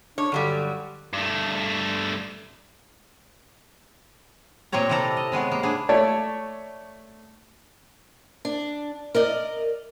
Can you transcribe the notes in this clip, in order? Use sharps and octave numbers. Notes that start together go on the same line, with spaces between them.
D4 C#5
G2 D3 F#3 G3
G2 A3
A#2 A#3 C4 C#5 A#5
C3 C4 E4 A4 D5 A#5
D#5
C3 G#3 B3 C#5
A#3
A#3 B3 D4 G#4
A3 C#5 D5 A5
D4
A#4 D5 D#5